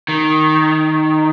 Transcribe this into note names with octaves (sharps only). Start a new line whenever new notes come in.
D#3